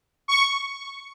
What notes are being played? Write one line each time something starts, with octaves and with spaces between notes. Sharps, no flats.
C#6